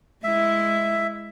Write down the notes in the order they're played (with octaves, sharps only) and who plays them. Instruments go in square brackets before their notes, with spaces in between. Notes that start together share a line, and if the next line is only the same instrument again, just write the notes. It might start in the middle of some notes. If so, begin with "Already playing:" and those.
[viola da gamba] G#3 E4 [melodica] E5